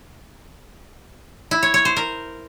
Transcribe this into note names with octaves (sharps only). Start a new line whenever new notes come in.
E4
C#5
C#5
C5
A#4